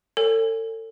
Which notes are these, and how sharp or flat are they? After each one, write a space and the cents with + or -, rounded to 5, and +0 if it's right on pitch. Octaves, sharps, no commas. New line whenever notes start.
A4 +35 C#5 +0 G#5 -25